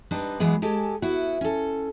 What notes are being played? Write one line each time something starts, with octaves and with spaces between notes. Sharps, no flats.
G3 D4 D#4 B4 C5
E3 F#3 G#3 B3
G#3 G4 A4 G#5
B3 E4 F#4
C#4 A4